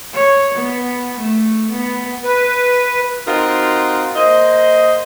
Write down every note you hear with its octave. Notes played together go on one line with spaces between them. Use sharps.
C#5
B3
A3
B3
B4
C4 D#4 F4 F#4 A#4
A#3 C5 D#5